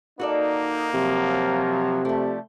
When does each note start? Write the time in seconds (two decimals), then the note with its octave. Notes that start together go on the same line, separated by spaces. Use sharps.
0.20 A#3 D#4 F#4 A4 D5
0.94 C3 F3 F#3
2.05 F3 G3 A3